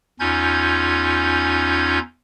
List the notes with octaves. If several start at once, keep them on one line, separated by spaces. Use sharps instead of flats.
E2 C#4 D#4 F4 G6 G#6